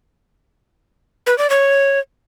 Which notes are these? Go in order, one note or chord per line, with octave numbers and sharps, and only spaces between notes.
B4
D5
C#5